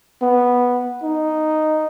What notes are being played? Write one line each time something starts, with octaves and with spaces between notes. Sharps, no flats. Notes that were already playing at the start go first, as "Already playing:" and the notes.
B3
D#4